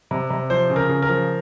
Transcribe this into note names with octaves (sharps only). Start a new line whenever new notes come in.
C3
C3
F3 C5
C#3
A#4
C#3
A#4
F3